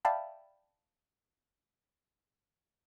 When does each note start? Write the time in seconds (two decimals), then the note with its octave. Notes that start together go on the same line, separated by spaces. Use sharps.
0.05 D5 E5 F5 G5 A5 B5